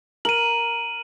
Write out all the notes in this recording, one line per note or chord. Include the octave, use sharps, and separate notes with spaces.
A#4 D#7 F#7